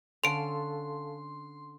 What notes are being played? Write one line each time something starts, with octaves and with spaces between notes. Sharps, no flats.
D3 C#4 A4 F5 A5 C6 D7 F7